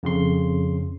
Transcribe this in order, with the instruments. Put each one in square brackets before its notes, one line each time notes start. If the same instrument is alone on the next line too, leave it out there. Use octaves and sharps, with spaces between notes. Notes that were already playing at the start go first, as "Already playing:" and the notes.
[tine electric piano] F2 C#3 C6